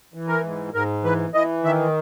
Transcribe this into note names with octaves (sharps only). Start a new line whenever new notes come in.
E3
A#4
G#2
G#2 A#4
E3 B4
E3 D#5
D#3 E5